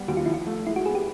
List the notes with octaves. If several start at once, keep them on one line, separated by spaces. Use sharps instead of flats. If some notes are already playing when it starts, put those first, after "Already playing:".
Already playing: G3 B3
D#2 F#4
F4
F3 E4
F4
A3
G#3 E4
F#4
B3 G#4
G4